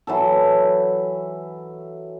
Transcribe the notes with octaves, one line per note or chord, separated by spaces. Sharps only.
E3 F#3 A4